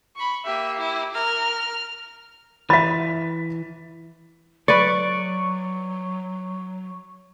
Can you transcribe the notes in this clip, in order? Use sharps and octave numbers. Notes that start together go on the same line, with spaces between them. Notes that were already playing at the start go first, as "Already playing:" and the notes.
B5 C#6
A#3 G4 E5
E4
A#4 F6
E3 E5 B5 A6 B6
F#3 B4 D5 C#6